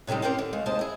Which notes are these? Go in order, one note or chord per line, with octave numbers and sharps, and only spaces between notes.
A2 C3 D#3 G3 G#3
C4 C#4 G4 A#4 C5
D3
G#3 A3 F5
D#2 C3 G#3 C5 D#5 A5
E4 G#4